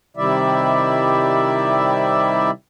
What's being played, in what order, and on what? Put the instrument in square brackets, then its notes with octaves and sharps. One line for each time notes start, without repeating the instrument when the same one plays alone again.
[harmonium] C3 D#3 G3 E4 D5 E5